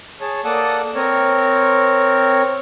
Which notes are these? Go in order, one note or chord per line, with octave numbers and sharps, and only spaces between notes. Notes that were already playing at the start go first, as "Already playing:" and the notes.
G#4 C#5 A5
A#3 A4 D5 F#5 A5 D#6
C4 A#4 C#5